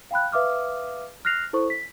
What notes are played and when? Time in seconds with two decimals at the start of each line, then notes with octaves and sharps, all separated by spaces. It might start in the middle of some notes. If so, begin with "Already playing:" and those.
0.11 F5 G5 B5 F#6
0.32 B4 E5 F5 D6 D#6 F6
1.25 F6 F#6 A#6 C7 F7
1.53 E4 A4 C5 C#6
1.70 B6